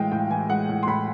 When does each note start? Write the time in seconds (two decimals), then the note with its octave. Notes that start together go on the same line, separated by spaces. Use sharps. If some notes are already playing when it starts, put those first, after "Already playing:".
Already playing: A2 E3 G#3 F5 G5
0.12 A2 G5
0.31 E3 G#5
0.49 G#3 F#5
0.69 A2
0.83 C6
0.87 A2 B5